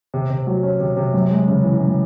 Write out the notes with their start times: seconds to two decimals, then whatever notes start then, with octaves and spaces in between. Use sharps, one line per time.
0.14 C3
0.30 C3
0.47 F#3
0.63 C#4
0.80 C3
0.97 C3
1.14 F#2
1.30 G#3
1.48 C#3
1.64 E3
1.80 F#2